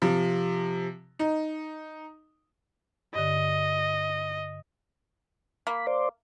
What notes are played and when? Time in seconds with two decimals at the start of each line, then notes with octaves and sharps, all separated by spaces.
0.02 C3 F3
1.19 D#4
3.15 G2 D3 D#5
5.67 A#3 B5
5.87 C5 D5